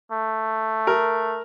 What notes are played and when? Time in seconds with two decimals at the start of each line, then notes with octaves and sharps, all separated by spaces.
0.12 A3
0.87 A#4